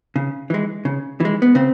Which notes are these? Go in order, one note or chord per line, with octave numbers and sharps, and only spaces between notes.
C#3
E3 G#3
C#3
E3 G#3
B3
C#3 C4